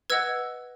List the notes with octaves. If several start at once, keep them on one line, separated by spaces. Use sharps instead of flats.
B4 D#5 F#5 E6 G#6